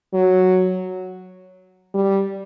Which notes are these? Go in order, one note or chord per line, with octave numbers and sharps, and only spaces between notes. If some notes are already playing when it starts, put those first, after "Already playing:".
F#3
G3